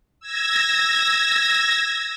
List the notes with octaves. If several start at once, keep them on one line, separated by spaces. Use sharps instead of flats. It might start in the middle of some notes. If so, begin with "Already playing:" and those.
E6 G#6 A#6